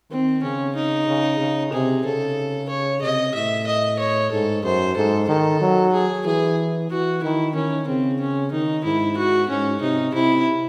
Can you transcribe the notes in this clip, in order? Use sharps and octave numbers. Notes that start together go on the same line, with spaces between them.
D#3 C4
C#3 C#4
D#4
C#3
C#3
C3 G#4
C#3 A4
C#5
C3 D#5
A2 E5
D#5
C#5
G#2 A4
F#2 C5
G#2 A4
D#3 A4
F#3
G#4
E3 G#4
E3 F#4
D#3 E4
D#3 C#4
C#3 C4
C#4
D#3 D#4
G#2 E4
F#4
G#2 C#4
C3 D#4
C3 E4